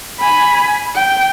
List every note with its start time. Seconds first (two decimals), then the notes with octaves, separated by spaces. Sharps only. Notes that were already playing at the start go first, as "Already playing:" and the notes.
0.20 G#5 B5
0.95 G5